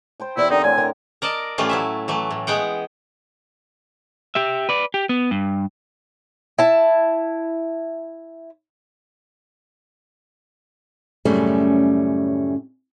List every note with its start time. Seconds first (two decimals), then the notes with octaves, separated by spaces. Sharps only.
0.20 C5 G5 A5
0.37 E2 E4 G4 D5
0.50 D3 C4 D#4 A#4
0.64 A2 G#5
0.78 A#4
1.22 A#4 D5 D#5 A5
1.58 A2 E3 G3 A3 C#4 F4
1.69 F#3 E4 E5
2.08 E3 F#3 A3
2.31 A2
2.47 G#3 B3 F#5 G5
4.35 G4 E5
4.69 B4 D5
4.94 G4
5.09 B3
5.31 G2
6.58 E4 A5
11.25 F#2 A2 C#3 G3 A3 C#4